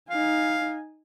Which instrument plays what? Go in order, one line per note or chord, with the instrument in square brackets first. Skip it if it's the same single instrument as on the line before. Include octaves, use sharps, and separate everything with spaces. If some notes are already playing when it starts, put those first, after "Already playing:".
[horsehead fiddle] D#4 G#5 [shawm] F5